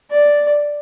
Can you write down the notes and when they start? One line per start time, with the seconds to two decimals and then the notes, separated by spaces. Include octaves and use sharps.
0.11 D5